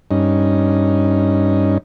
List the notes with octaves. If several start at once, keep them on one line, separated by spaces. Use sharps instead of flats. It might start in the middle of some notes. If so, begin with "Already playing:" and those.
G2 C#4 D#4